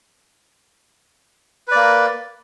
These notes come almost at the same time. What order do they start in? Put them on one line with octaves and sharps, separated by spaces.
B4 D5 A#3